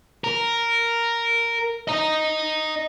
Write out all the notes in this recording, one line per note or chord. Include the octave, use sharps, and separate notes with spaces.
A#4
D#5 A#5